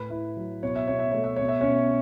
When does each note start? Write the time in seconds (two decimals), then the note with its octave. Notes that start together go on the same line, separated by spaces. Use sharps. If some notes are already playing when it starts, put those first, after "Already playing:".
Already playing: A2 B4 B5
0.10 E4
0.37 F#3
0.63 B2 C#5
0.76 E5
0.88 B2 C#5
0.99 E5
1.11 A3 C#5
1.24 E5
1.36 B2 C#5
1.48 E5
1.61 C#4 C#5
1.67 B2